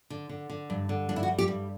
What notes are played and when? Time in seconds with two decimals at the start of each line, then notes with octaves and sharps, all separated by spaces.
0.10 D3
0.29 D3
0.50 D3
0.70 G2
0.89 D3
1.09 G2 D4
1.16 E4
1.23 F#4
1.28 G3
1.38 G4
1.48 G2